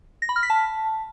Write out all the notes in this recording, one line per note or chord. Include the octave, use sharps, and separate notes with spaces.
A#6
B5
F6
B6
A5